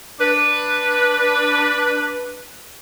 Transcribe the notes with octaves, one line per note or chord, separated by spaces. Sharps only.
D4 B4